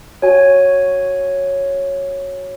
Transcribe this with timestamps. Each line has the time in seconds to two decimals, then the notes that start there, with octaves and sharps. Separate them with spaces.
0.22 F#4 C#5 G#5